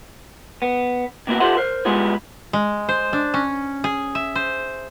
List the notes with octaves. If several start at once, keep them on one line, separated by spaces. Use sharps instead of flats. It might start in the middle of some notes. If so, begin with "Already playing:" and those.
B3
C3 A#3 B3 E4 F#4
F4 G4 A4 C5 E5 F#5
A#4 C5
G3 G#3 B3 E4 F4 G#4
G#3
C5
D4
C#4
G#4
E5
C5